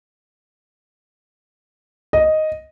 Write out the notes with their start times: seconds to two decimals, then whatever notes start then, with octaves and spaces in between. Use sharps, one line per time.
2.13 D#5